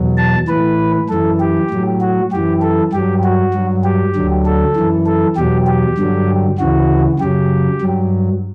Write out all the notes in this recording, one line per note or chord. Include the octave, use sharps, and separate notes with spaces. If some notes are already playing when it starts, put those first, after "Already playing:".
Already playing: E2 B2 F#3
A5
A2 E3 B4
F#2 E3 A4
G4
A2 F#3
F#4
F#2 E3 G4
A4
G2 F#3 G4
F#4
G2 F#3
G4
D2 D3 F#3
A4
F#2 E3
A4
E2 B2 F#3 G4
G4
G2 D3 F#3
D2 C#3 E3 F#4
F#2 C#3 F#3 G4
G2 F#3